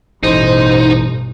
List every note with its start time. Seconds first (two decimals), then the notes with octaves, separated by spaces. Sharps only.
0.23 A1 G2 B2 D#4 C5